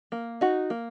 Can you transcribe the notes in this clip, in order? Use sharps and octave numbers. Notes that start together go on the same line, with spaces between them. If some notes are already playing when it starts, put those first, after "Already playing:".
A#3
D#4 F#4
A#3